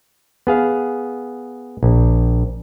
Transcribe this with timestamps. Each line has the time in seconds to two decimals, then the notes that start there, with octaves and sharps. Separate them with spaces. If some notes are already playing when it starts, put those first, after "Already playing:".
0.47 B3 G#4 F5
1.83 A#1